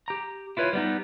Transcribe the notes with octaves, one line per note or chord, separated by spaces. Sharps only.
G4 A#5
E4 F4 B4 C#5
G3 B3 D#4